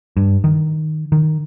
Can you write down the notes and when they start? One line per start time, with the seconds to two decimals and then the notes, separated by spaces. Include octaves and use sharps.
0.17 G2
0.44 D#3
1.12 D#3